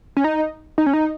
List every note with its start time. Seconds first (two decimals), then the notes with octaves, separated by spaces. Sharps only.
0.17 C#4
0.24 D#4
0.78 D#4
0.86 C#4
0.93 D#4